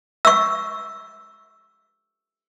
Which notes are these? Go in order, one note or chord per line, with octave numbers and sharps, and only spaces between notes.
C#6 E6